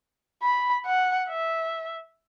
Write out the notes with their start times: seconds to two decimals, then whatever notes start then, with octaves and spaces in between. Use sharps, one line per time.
0.42 B5
0.86 F#5
1.29 E5